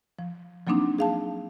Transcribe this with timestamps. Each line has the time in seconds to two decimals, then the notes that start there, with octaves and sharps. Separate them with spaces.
0.19 F3
0.67 F3 F#3 A#3 C4 D4 D#4
0.99 G#4 F5 A5